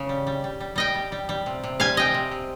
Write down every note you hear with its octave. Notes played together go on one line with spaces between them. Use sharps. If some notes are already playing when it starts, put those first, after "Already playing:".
Already playing: C#3
G3
G3
G3
G3
G3 D#5 G5
G3
G3
G3
C3
C3
G3 F5 G#5
C3 D#5 G5
C3
C3